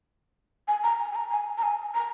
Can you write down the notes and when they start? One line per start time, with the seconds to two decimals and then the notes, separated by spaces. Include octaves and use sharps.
0.68 G#5
0.84 A#5
1.00 G#5
1.11 G#5
1.16 A#5
1.31 G#5
1.58 A#5
1.63 G#5
1.95 A#5